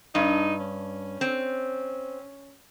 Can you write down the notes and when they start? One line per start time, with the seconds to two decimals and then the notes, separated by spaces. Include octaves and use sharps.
0.15 G2 D#4
0.60 C#4
1.21 C4